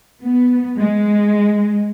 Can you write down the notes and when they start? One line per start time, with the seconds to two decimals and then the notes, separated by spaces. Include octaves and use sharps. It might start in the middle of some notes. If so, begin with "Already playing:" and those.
0.21 B3
0.79 G#3